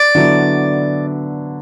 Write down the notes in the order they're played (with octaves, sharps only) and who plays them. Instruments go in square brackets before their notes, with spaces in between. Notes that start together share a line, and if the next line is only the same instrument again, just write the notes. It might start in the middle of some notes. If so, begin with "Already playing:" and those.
Already playing: [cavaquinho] D5
[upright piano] D3 F#3 B3 E4